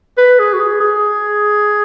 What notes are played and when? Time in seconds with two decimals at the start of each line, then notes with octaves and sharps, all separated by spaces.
0.17 B4
0.39 G#4
0.53 F#4
0.60 G#4
0.80 G#4